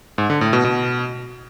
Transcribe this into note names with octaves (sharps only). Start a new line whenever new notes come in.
G#2
D3
A2
B2
B2